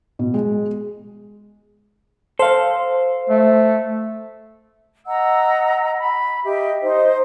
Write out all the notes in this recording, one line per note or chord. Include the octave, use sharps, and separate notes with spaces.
B2
G#3
A4 C5 F5
A3
D#5 F#5 A#5 E6
B5
G4 D#5 E5
D#4 C5 D#5